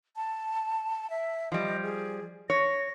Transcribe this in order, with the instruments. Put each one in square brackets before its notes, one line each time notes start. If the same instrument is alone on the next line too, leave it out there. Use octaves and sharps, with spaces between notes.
[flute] A5
E5
[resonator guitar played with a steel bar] F3 G3 [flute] D#5
[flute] G#4
[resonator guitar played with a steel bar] C#5 [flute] A#6